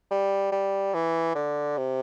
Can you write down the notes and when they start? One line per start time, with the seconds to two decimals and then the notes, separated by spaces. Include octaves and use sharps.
0.11 G3
0.52 G3
0.94 E3
1.35 D3
1.78 C3